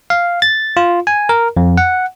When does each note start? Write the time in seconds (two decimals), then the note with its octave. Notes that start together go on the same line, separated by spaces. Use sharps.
0.10 F5
0.42 A6
0.77 F4
1.07 G#5
1.29 A#4
1.57 F2
1.78 F#5